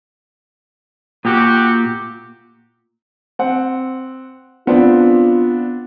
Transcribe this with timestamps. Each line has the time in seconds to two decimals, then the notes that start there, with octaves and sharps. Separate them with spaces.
1.25 A#2 F#4 G4
3.39 C4 F#5
4.67 B3 C4 D4 F4